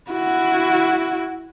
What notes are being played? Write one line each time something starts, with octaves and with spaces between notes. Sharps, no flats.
E4 F#4